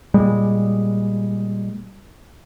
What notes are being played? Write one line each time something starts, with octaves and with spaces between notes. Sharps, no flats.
A#2 G3 G#3